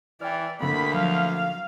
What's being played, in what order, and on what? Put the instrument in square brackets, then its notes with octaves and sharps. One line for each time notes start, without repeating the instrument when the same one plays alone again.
[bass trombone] E3 [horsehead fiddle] D5 [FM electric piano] G5 E6 F6
[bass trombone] D2 [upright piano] D3 A#3 [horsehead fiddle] B5
[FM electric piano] F3 F#3 [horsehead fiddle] F5